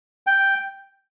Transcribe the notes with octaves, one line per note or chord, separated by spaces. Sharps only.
G5